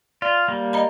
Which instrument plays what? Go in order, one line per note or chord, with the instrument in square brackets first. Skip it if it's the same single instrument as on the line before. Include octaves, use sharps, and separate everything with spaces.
[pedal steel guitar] F4 [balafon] D5
[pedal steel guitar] G3 A#3
[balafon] D#5 A#5 B5